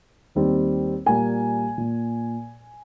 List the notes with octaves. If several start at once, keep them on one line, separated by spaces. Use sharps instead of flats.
D#2 D#3 G3 C4
A#2 G3 A#3 G#5
A#2